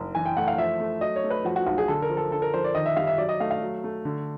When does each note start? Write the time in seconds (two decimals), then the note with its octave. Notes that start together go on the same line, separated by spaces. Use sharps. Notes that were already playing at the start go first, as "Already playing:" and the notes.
Already playing: F#1
0.15 E3 G#5
0.26 G5
0.37 A3 F#5
0.48 F5
0.58 F3 E5
0.80 A3
1.01 F#3 D#5
1.16 C#5
1.24 A3
1.30 B4
1.45 F3 F#4
1.56 F#4
1.66 B1 F#4
1.78 G#4
1.88 D3 A4
2.02 A#4
2.10 F3
2.17 A4
2.31 D3 A4
2.42 A#4
2.54 F3 C5
2.64 D5
2.75 D#3 D#5
2.86 E5
2.96 G3 F5
3.07 E5
3.18 F#3 D5
3.29 D#5
3.40 A3 F5
3.51 F5
3.62 F#3
3.84 A3
4.05 D3